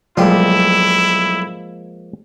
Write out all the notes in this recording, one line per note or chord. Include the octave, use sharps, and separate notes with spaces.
B1 F3 G3 G#3 A#3 E4